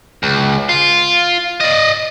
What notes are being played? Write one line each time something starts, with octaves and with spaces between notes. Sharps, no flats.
C#2
F4
D5 D#5